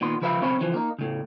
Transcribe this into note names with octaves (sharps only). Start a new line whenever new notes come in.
A#2 D#3 B3 C6
C#3 F3 B4 E5 F5 B5
B1 C#3 C4 C#5 B5
C#3 E3 F3
A#3 D#4
A2 C#3